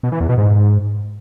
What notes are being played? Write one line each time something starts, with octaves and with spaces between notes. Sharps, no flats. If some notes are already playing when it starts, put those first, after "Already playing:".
B2
E3
E2
B2
G#2